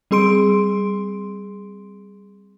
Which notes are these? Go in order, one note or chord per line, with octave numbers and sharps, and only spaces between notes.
G3 C4 G#4 C6 D7